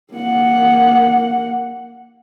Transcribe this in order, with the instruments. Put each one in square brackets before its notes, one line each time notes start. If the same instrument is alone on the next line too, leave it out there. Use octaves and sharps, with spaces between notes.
[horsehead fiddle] A#3 F#5